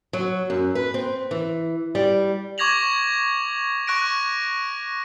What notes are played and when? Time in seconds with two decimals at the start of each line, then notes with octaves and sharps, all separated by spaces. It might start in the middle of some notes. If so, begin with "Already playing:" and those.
0.13 F#3
0.50 F#2
0.75 B4
0.94 C4
1.31 E3
1.95 G3
2.58 C#6 D6 G#6 A#6 F7 F#7
3.87 C#6 F#6 A#6 D7